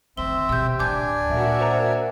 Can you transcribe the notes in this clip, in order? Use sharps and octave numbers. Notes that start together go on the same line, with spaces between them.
D2 D#3 C4 E5 G7
B2 G4 E6 G6
D1 D2 D4 D5 G#5 D6 G6
A#2 F#4 A#4 E5
C5 F#5 A#5